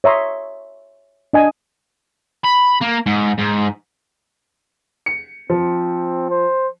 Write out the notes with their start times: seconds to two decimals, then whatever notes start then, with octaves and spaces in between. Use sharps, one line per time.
0.04 C#5 E5 A#5 C6 D#6
1.33 D4 D#5 G#5 D#6
2.44 B5
2.81 A#3
3.06 G#2
3.39 G#2
5.06 C#7
5.50 F3 C4
6.30 C5